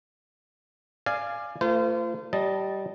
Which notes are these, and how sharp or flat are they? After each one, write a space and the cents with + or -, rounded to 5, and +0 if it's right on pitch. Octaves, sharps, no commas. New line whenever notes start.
D5 +20 F5 -15 G#5 +0
A3 +35 F4 -30 C5 -35
G3 -20 D#5 +0 A5 +0